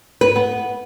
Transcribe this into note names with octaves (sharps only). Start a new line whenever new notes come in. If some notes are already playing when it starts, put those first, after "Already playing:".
B4
B3